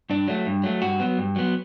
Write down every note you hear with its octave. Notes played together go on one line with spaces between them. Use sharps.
G2 D4
F#3 A3
G2
F#3 A3
G2 F#4
F#3 B3
G2
F#3 B3